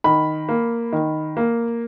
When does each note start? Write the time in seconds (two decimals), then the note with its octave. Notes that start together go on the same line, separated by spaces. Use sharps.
0.04 D#3 B5
0.49 A#3
0.93 D#3
1.37 A#3